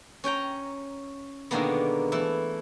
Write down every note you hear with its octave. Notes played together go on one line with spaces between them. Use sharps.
C#4 C#5 G5 A#5
B2 D3 D#3 G#3 A#3 B3
E3 A3 E4